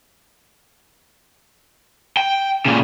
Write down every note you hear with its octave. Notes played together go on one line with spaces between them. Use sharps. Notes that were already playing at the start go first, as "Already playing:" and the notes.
G5
A#2 C#3